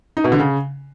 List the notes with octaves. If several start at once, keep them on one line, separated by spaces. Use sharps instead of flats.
D#4
B2
D3
C#3